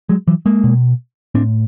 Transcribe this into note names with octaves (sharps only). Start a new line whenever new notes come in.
F#3 G#3
E3 F#3
G#3 A#3
B2
A2 C4 D4